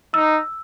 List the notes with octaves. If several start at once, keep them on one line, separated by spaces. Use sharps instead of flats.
D#4 E6